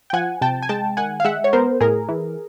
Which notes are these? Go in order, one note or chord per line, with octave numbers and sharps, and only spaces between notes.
G5
F3 F#5 G#5
C3 G5 A5
G#5
G#3 G5 A5
D#3 F#5 G#5
F5
G#3 E5 F#5
C#5
B3 A#4 C5
A2 G#4 A#4
E3